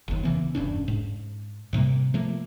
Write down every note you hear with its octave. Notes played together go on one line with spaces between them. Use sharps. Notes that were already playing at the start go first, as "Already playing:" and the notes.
F#1 D#2
C#3 E3 B3
E1 G2 C#4 D4
G#2
G#2 C3 G3 A#3
F3 A3 A#3